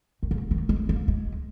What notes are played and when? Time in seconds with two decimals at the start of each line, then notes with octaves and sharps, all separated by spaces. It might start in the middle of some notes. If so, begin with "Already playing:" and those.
0.23 D#3
0.31 C#3
0.51 D#3
0.69 G#3
0.89 A#3
1.08 G#3